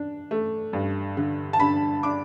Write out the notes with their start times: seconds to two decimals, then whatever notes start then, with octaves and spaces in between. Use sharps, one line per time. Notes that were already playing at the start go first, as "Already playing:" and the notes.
Already playing: D4
0.31 A3
0.73 G2
1.17 D3
1.53 A5
1.60 D3 B5
2.03 D4 D6